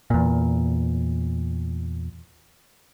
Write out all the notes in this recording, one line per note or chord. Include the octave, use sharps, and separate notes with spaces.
E2 A#2